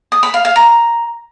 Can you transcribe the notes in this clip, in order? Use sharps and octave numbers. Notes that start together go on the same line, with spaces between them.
D#6
B5
F5
F5
A#5